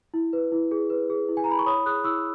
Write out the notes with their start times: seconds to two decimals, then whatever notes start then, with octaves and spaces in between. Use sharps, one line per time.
0.14 E4
0.33 B4
0.52 E4
0.71 G#4
0.90 B4
1.10 G#4
1.29 E4
1.37 G#5
1.44 A#5
1.47 E4 B5
1.59 C#6
1.66 C#5 B5 D#6
1.86 G#4 D#6 F#6
2.04 E4 C#6 E6